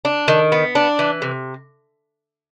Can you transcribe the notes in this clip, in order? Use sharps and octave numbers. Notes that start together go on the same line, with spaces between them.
D4
D#3
B3
D4
E3
C3